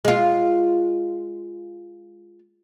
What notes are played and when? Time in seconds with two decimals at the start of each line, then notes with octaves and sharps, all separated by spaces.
0.05 G#3 F4